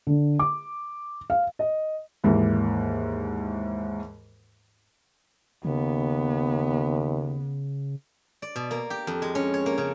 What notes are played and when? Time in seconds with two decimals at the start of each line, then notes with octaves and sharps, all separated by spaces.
0.07 D3
0.39 D6
1.30 F5
1.59 D#5
2.24 D#2 G#2 E3 A#3
5.65 D#2 C#3 B3
8.42 D5
8.56 B2
8.71 A#3
8.90 G4
9.07 F2
9.22 G#3
9.35 C#4
9.54 C#5
9.66 A#3
9.78 C#3